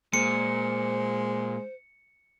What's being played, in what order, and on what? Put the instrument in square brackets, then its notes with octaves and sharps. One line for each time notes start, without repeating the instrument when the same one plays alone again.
[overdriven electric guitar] A#2 [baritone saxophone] G#3 [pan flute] C5 [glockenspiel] C#7